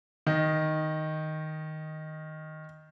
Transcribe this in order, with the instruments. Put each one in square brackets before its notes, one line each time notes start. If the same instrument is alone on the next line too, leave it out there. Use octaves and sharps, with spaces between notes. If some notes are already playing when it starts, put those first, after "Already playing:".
[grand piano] D#3 D#5